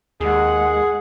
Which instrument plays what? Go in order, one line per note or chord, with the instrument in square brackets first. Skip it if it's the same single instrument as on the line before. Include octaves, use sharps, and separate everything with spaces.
[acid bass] D#2 [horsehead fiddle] G#3 F#5 [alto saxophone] G#4